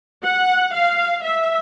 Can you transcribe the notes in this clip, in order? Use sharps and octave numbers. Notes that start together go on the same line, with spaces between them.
F#5
F5
E5